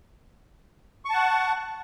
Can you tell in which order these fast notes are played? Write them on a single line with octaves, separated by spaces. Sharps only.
C#6 A5 F#5